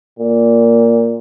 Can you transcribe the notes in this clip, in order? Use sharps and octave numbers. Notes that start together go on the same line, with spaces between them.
A#2